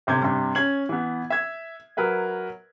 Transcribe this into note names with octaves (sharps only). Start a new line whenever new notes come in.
G1 C3 G6 G#6
G2 C3
C#4 G#6 F#7
E3 B3
E5 G#6
F#3 A#4 B4 E5